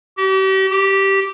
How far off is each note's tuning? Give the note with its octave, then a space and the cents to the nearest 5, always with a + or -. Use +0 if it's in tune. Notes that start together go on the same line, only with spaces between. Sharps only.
G4 -40
G4 -10